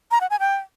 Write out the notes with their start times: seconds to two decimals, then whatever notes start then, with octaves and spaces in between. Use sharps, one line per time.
0.11 A#5
0.21 F#5
0.30 G#5
0.40 G5